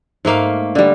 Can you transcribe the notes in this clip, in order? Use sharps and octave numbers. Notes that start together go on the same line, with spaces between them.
G#2 A3 A#3 F5
D3 G3